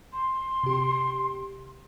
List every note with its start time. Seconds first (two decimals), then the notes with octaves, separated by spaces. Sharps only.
0.13 C6
0.63 C3 G4